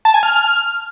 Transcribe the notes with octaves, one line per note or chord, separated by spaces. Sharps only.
A5
G#5
F6